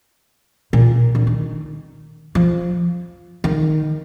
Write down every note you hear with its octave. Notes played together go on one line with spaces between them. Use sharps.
A#2
D3
D#3
F3
D#3